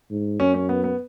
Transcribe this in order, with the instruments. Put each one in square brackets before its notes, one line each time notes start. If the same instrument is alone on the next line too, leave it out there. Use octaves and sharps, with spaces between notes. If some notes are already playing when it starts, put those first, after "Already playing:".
[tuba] G#2
[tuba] F#2 [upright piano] C#4
[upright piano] C#4
B3
B3